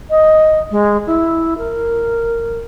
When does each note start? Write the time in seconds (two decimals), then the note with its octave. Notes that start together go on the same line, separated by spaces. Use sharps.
0.10 D#5
0.71 G#3
1.06 E4
1.58 A#4